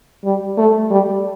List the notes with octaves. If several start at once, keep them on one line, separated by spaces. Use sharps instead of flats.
G3
A3
G3